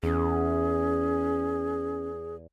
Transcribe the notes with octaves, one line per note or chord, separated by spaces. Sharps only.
E2 C#4 G#4